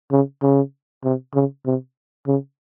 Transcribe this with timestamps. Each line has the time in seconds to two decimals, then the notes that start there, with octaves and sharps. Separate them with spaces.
0.12 C#3
0.42 C#3
1.04 C3
1.35 C#3
1.66 C3
2.27 C#3